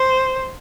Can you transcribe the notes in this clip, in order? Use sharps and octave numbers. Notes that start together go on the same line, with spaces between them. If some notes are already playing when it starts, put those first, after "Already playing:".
Already playing: C5